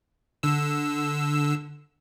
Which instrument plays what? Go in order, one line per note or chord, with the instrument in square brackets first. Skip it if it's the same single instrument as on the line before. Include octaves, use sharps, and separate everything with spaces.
[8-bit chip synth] D3 E6